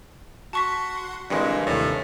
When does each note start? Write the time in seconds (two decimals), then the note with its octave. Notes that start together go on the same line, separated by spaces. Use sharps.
0.53 F#4 F#5 A5 C6 C#6 B6
1.30 G2 A#2 D3 E3 G#3 C4
1.66 D#2 A2 C3 D#3